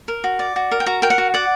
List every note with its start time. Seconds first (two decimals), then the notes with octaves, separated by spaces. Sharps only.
0.08 A#4
0.24 F#4
0.39 D5
0.56 F#4
0.71 A#4
0.80 G5
0.86 F#4 A#5
1.02 A#4 G5
1.10 F#5
1.18 F#4
1.34 D5 F#5